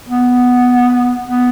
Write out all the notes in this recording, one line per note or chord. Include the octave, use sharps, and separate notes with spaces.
B3
B3